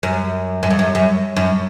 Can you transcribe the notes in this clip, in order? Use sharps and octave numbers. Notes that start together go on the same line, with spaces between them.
F#2
F#2
F2
F#2
F#2
F#2